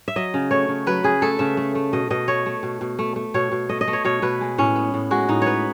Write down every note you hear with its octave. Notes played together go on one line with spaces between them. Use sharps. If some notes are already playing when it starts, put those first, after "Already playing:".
E5
F#3 D#5
C#3
A3 C#5
C#3
F#3 B4
C#3 G#4
A3 A4
C#3 E5
A3
A3
B2 D#5
B2 D#5
A3 C#5
A3
B2
B2
A3
A3
B2 C#5
B2
A3 D#5
D#5
A3
C#5
B2 C#5
B2 B4
G#3
A2 C#4
B3
A2
G#3 F#4
A2 D#4
B3 B4 C#5